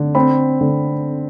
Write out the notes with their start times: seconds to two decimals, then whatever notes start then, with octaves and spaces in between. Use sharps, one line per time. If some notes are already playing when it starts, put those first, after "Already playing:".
Already playing: D3
0.15 C4 B5
0.61 D3